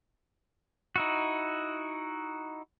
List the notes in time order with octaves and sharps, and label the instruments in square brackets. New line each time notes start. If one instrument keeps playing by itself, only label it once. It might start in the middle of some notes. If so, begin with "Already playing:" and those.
[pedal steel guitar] D#4 E4 F#4